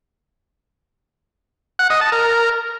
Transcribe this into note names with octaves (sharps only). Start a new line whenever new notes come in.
F#5
D#5
A5
A#4